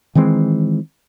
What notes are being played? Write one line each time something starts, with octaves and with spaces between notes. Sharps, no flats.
D#3 E3 G#3 C4